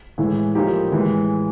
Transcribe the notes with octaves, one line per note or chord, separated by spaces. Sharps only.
A2 E3 G#3
A2 F3 A#3 D#4 G4
A2 E3 G#3